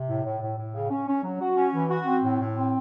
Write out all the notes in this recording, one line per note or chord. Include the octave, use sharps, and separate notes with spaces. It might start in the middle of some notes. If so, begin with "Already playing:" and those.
Already playing: C3
A2
A2
A2
A2
C#3
C#4
C#4
F#3
F#4
C#4
E3
F#4
C4
A2
A2
C4